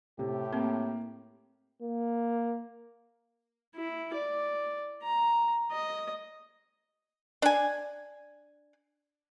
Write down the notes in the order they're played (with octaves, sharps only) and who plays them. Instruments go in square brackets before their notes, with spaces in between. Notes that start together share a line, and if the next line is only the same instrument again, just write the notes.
[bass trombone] A2 [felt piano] C3 [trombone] G4
[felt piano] A#3 [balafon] C4
[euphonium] A#3
[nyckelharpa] E4
D5
A#5
D#5
[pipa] D4 G#5